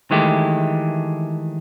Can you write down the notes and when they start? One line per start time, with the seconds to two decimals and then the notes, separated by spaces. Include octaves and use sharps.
0.11 D#3 E3 G#3 A3 G4